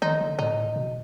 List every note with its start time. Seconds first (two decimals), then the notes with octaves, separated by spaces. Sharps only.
0.02 D#3 D#4
0.21 D3
0.39 A2 D#4
0.76 B2